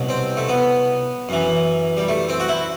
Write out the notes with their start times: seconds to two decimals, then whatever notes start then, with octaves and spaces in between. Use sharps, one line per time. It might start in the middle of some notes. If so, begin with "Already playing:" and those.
Already playing: C2 B2 F#3
0.09 C4
0.37 A3
0.49 B3
1.29 F#2 E3
1.97 G3
2.09 A3
2.29 C4
2.40 F#4
2.49 E4